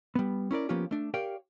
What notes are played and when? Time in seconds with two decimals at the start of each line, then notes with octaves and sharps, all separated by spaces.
0.15 G3 B3
0.51 C#4 E4 A#4 D5
0.69 F3 A#3 B3 C#4 F4 G4
0.91 A3 D4
1.14 G4 A#4 C#5 D5 F5 G5